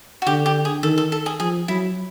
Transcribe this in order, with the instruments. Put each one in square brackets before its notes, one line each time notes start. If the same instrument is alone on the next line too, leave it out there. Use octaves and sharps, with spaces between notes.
[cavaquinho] F#4
[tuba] D3 [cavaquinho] G4
[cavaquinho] G4
G#4
[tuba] D#3 [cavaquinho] A4
[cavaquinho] A4
A4
G#4
[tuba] F3 [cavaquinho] G#4
[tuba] F#3 [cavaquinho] E4